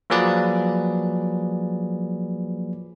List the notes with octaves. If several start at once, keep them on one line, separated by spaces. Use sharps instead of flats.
F3 F#3 A#3 G#4 B4 D5